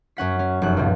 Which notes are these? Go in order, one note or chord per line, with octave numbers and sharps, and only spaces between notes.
F#2 C#4 F#5 B6
C#4
F1 F#2 F#6
C#2 G2 A#2